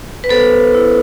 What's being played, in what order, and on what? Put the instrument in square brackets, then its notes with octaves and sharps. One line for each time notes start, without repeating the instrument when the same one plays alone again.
[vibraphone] B4
B3 A4 C5
E4